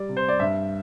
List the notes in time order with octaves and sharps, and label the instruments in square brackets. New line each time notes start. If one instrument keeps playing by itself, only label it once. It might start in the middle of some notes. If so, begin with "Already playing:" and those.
Already playing: [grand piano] G3 D5
C3
C5
D5
G2 E5